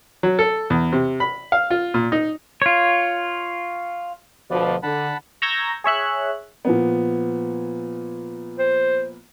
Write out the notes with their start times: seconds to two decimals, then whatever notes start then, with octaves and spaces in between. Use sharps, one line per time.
0.23 F#3
0.39 A4
0.70 E2
0.92 C3
1.20 B5
1.52 F5
1.70 F4
1.94 A#2
2.12 D#4
2.62 F4 C#5
4.51 D2 B2 F3 B4 D5
4.83 D3 F#5 A5 B5
5.42 A#5 C#6 E6 G6 G#6 A#6
5.84 G#4 C#5 E5 F#6
6.65 A#2 F3 B3
8.59 C5